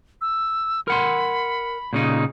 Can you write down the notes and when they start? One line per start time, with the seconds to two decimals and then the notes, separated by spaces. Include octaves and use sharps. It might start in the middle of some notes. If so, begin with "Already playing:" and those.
0.21 E6
0.88 A#4 F#5 B5 C6
1.93 A#2 C#3 D#4